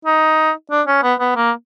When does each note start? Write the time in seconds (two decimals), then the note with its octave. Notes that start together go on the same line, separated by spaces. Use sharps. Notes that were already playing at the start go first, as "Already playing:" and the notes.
0.05 D#4
0.71 D4
0.87 C#4
1.03 B3
1.20 B3
1.36 A#3